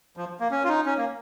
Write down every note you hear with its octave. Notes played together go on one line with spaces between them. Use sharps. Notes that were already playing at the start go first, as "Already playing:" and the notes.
F3
A#3
C#4
F4
D#4
C#4
A#3